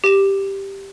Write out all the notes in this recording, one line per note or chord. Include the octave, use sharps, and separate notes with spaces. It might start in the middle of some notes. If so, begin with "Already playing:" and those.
G4 E7